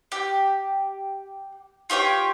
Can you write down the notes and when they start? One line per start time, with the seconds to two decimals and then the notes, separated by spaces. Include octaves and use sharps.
0.12 G4
1.90 F4 G4 C#5 G5